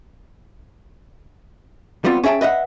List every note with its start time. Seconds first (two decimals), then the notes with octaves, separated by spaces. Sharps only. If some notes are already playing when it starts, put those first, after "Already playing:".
2.05 G3 B3 C4 F4
2.24 C#4 G#4 E5 G5 A5
2.41 B4 D#5 E5 F#5